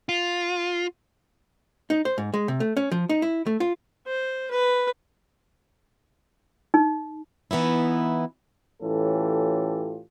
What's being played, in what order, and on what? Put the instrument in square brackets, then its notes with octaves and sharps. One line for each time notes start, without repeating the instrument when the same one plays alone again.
[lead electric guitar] F4
[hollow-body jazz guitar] D#4
C5
G#2
G#3
C3
A3
C#4
F3
D#4
E4
A3
F4
[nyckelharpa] C5
B4
[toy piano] D#4
[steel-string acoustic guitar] E3 B3 D#4 E4
[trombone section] A2 E3 C#4 F4 G4 A4